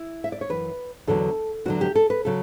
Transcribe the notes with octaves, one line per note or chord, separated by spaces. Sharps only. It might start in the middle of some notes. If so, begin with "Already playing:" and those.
Already playing: E4
E5
D5
C#5
F#2 E3 B4
E2 D3 F#3 A4
E2 D3 F#3 F#4
G4
A4
B4
C#3 F#3 A4